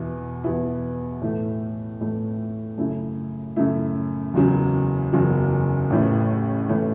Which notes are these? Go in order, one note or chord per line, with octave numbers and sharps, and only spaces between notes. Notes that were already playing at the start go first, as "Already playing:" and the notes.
Already playing: E2 B2 B3 E4
E2 B2 B3 E4
A2 E3 A3
A2 E3 A3
F#2 C#3 A3 E4
F#2 C#3 A3 E4
F#1 E2 C#3 F#3
F#1 E2 C#3 F#3
A1 A2 E3 A3 C#4
A2 E3 A3 C#4